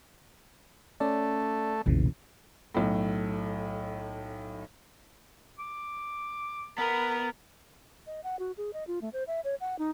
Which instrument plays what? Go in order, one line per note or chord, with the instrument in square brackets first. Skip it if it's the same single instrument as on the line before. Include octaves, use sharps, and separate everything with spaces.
[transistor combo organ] A3 [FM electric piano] C#4 D5
[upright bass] F1 B1 [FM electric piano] A#2 C#3 E3
[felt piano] B1 A2
[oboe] D6
[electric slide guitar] B3 [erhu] A#4 [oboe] B5
[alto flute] D#5
F#5
F#4
G#4
D#5
F4
A3
C5
E5
C#5
F#5
D#4